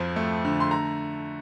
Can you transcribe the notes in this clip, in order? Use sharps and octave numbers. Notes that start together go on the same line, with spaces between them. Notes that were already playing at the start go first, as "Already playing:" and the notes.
Already playing: F2 F3
A3
D3
C6
A#5